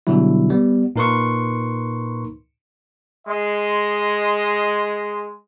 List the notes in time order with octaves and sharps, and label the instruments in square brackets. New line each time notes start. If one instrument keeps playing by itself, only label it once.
[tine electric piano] B2 D3 F#3 G3 E4
G3 B3
A#2 D#4 A#4 B4 C6 C#6
[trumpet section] G#3 D#5 C6